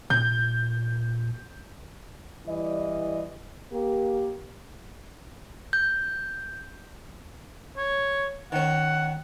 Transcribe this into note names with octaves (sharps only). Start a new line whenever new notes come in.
A#2 G6
E3 G3 D#5
A#3 G4
G6
C#5
D#3 C#4 F#5